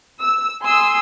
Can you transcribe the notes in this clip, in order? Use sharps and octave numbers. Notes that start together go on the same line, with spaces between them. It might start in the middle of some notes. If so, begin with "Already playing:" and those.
E6
G#5 C6 D#6 E6